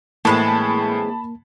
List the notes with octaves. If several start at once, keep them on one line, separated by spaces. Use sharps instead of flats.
A2 E3 G#3 A#3 C4 A5 B5